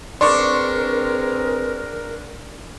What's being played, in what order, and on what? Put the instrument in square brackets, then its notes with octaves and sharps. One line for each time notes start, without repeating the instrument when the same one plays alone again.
[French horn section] C4 G#4 B4 [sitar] D4 [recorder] A#4 [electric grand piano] C6 C#6